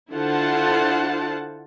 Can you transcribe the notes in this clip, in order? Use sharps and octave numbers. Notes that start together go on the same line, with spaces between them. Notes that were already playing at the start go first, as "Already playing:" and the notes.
D3 E4 F4 C5 F#5 A5